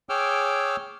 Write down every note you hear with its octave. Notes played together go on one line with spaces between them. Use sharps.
G#4 C#5 G5 D6 E6 F6